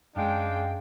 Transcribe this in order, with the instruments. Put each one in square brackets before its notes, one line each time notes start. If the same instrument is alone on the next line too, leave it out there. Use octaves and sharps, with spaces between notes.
[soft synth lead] F#2 [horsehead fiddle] G#3 [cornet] D4 [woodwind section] F5 G5